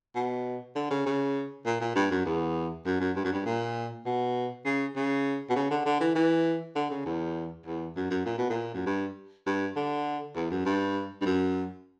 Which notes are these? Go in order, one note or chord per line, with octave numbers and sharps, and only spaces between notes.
B2
D3
C#3
C#3
A#2
A#2
G2
F#2
E2
F#2
F#2
G2
F#2
G2
A#2
B2
C#3
C#3
B2
C#3
D3
D3
E3
E3
D3
C#3
E2
E2
F#2
F#2
A#2
B2
A#2
F#2
G2
G2
D3
E2
F#2
G2
G2
F#2